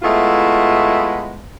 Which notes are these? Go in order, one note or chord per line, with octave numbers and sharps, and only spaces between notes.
G#3 A3 B3 E4 F4